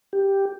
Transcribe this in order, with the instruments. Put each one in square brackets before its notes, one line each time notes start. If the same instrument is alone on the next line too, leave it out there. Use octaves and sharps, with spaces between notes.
[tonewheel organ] G4